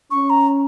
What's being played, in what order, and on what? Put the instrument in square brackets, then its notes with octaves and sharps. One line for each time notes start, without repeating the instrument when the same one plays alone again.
[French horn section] C#4 [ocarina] C#6
[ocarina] A#5